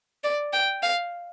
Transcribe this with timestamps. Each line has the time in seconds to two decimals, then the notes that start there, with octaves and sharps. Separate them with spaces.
0.24 D5
0.53 G5
0.83 F5